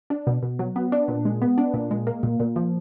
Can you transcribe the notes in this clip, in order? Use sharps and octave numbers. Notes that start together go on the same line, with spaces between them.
D4
B2
B2
F#3
B3
D4
A#2
G#3
B3
D4
A#2
G#3
A#3
A#2
A#2
F3